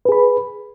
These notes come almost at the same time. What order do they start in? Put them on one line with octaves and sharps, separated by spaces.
B4 G#4 B5